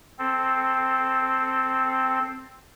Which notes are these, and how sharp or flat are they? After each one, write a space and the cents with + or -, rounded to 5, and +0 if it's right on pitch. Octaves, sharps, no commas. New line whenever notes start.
C4 +0 A4 +0